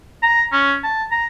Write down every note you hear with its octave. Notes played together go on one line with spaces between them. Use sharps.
A#5
C#4
A5
A#5